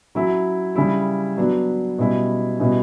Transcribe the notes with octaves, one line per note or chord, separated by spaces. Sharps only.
F#3 C#4 E4
C#3 G3 C#4 E4
F#3 B3 D4
B2 G3 C#4 E4
B2 G3 C#4 E4